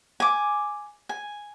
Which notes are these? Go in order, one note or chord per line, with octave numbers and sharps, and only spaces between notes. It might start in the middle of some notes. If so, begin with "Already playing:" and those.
G#5 D6
G#5